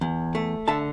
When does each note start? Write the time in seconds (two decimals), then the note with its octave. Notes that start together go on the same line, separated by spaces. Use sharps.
0.01 E2
0.35 A3
0.68 D3 E5 A5